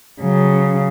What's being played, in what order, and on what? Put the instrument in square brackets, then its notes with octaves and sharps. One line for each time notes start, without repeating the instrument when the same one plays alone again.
[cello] C#3 F#3